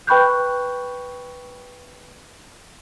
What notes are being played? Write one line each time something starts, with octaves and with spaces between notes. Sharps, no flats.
B4 G5 B5 C#6 F#6 G6